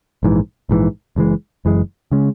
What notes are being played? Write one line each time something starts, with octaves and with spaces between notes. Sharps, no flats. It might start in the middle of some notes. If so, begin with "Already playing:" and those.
A#1 G#2 E3
A#1 G#2 E3
F#1 F#2 E3 G#3
F#1 F#2 E3 G#3
C#3 G#3 C#4